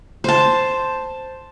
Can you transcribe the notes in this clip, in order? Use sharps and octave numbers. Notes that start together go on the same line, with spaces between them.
C5 A5